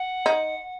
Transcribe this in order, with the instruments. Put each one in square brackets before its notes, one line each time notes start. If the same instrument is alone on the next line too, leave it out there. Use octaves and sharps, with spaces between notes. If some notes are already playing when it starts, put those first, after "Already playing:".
Already playing: [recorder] F#5
[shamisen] D#4